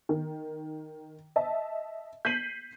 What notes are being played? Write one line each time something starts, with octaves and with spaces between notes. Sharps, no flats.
D#3
D#5 E5 A5
G6 B6 C7 D#7 F#7